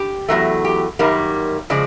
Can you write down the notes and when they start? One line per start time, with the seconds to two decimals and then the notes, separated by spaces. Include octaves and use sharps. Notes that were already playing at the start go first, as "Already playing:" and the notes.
Already playing: G4
0.29 E2 B2 F#3 A3
0.65 G4
0.99 F#2 D#3 G3 A#3
1.70 C#3 F3 G#3 D5